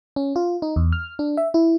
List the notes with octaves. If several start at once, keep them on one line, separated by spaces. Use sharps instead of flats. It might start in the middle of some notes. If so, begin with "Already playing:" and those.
C#4
F4
D#4
E2
F6
D4
E5
E4